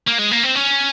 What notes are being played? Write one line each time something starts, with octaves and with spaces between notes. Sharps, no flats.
A#3
G#3
A#3
C4
C#4